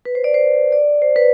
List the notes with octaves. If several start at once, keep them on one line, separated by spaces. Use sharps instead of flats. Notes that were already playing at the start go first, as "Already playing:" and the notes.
B4
C5
D5
C5
D5
C5
B4